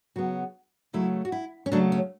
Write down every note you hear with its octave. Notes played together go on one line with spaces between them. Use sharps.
C#3 F#3 B3 F#4
C#3 F#3 A3 E4
F#4
E4
C#4
C#3 F#3 A3 D4
C#4